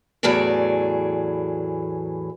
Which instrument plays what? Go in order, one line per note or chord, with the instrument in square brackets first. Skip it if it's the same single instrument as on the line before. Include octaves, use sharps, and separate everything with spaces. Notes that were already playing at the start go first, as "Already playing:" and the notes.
[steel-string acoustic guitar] E2 A2 E3 F#3 G#4 D5